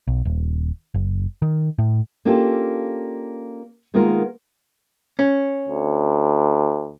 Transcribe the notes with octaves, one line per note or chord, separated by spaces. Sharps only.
B1
D#1
F#1
D#3
A2
A#3 C#4 D4 F4 G4 A4
D#3 G#3 A#3 B3 F4 A#4
C#4
D2